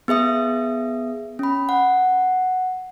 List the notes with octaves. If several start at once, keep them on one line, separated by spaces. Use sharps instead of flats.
B3 G#4 E5 D#6
C#4 B5
F#5